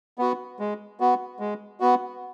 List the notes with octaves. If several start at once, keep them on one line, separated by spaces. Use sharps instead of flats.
B3 F#4
G#3
B3 F#4
G#3
B3 F#4